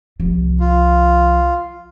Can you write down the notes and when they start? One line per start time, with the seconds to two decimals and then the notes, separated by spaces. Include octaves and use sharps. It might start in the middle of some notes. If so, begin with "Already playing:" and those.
0.20 C2 F3
0.60 F4